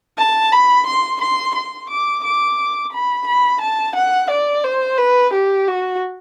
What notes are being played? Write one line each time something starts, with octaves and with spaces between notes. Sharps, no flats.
A5
B5
C6
C6
C6
D6
D6
B5
B5
A5
F#5
D5
C5
B4
G4
F#4